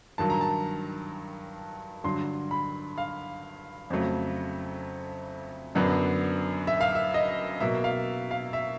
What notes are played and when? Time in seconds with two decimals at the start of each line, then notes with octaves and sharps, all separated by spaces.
0.18 G2 D#3 F#3 A5
0.30 A#5
0.41 A5
2.04 G2 D3 F#3 C6
2.51 B5
2.98 F5
3.90 F2 C#3 F#3 A3
5.75 F#2 D3 F#3 B3 D4
6.67 E5
6.81 F5
6.95 E5
7.14 D#5
7.60 B2 F#3 A#3 E5
7.84 F5
8.31 F5
8.53 E5